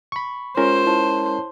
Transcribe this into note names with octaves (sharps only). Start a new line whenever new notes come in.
B5 C#6
G#3 C#4 F4 A#4 C5
E4 C#5 A5